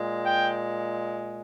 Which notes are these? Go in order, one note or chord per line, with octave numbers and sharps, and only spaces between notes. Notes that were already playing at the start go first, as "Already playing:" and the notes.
Already playing: A#2 G#3
G5